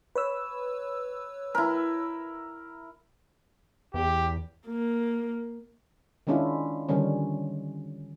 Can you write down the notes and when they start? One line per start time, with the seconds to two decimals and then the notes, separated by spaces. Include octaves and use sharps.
0.15 B4 C#5 E6
1.55 E4 A#4
3.94 E2 G4
4.67 A#3
6.27 D#3 G#3 C#4 D4 E4 F4
6.89 D3 D#3 F3 G3 C#4